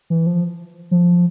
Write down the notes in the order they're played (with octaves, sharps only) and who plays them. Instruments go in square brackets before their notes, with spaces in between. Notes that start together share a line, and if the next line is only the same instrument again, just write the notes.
[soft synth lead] E3
F3
F3